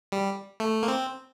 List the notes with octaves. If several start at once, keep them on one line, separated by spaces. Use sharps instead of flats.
G3
A3
A#3
C4